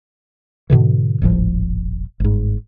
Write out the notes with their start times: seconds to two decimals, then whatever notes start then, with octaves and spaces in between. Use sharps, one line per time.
0.70 G#2 B2 D3 E3
1.22 D#1 G#1 A2 F3
2.20 G1 G#2